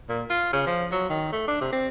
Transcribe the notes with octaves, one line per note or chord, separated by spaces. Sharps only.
A#2
F4
C#3
F3
F#3
D#3
A3
D4
C3
C4